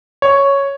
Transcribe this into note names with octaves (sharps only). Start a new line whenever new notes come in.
C#5